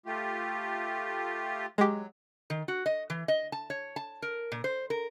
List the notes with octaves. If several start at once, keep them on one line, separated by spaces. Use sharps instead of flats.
A3 F4 G4
F#3 G#3 G4
D#3
F#4
D#5
E3
D#5
A5
C#5
A5
A#4
A#2
C5
A#4